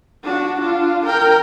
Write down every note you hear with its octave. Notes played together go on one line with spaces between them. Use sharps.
D4 F#4
D4 F4
A#4 G5